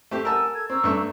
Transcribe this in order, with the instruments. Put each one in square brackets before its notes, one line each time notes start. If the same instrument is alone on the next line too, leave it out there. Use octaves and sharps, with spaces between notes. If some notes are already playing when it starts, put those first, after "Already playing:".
[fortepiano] A3 C4 G4
[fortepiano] A#4 A5 [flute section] F#5 G#5 E6
[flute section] A4 G#6
[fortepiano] C4 [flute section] A#5 C#6 E6
[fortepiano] G2 A3